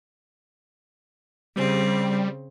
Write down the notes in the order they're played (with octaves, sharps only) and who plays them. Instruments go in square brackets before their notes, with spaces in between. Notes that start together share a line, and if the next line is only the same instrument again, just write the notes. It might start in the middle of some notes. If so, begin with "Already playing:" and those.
[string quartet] C#3 C4 [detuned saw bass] G3